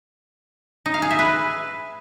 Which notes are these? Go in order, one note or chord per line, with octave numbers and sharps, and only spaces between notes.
D#4
F5
G#4
E5
B4